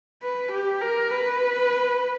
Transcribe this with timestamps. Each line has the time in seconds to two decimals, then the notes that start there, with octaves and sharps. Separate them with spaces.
0.23 B4
0.52 G4
0.82 A#4
1.11 B4